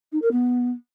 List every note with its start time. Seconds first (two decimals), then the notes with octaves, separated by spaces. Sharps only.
0.12 D#4
0.22 A#4
0.31 B3